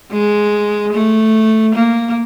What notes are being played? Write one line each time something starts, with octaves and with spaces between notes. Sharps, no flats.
G#3
A3
A#3